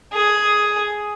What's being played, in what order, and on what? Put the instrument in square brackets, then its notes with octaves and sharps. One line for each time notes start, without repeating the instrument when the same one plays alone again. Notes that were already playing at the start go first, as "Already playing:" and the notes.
[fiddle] G#4